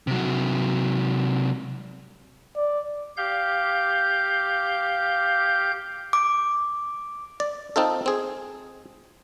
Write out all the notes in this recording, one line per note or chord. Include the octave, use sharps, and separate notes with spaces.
C3 F#3
D5
G4 F5 G6
D6
D5
C4 D#4 F4 A4
C4 G#4